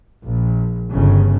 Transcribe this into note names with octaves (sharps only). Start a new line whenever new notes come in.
A#1
G1 C#3